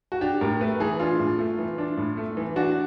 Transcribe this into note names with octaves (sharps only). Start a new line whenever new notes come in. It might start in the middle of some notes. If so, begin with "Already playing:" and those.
F#4
D4 G4
A2 A#4
A3 B4
E3 G#4
D4 F4
A2
A3
E3
D4
A2
A3
E3
D4 F#4